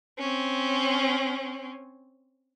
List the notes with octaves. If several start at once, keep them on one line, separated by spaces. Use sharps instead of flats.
C4 C#4